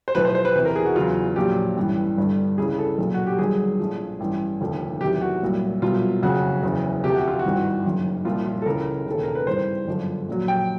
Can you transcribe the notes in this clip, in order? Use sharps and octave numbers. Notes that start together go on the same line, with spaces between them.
C5
B1 A2 F3 B4
C5
C5
B4
E2 C3 E3 B4
A#4
G#4
F#4
E2 C#3 F#3 F4
A#1 A#2 F#3 G4
A1 G2 E3
G1 G2 D3
C#2 C#3 E3 G#4
A4
B1 A#2 F#3
F#4
G4
G1 G2 D#3 F#3 G#4
A#1 A2 F3
A1 G2 E3
F1 D#2 D3 F3
E2 C3 D#3 F#3 G4
F#4
C2 A#2 F#3
C2 B2 F#3 F4
F#1 F2 C#3 F#4
F#1 E2 C#3
D2 C3 F3 G4
F#4
F4
F#4
G#1 G2 E3
F#1 F#2 D#3
C2 A#2 F3 F4
F4
A4
C#2 C#3 E3 A#4
E1 D#2 C#3 A4
A#4
B4
G#1 G2 E3 C5
G1 F#2 D3 F3
A#1 A#2 F#3
G5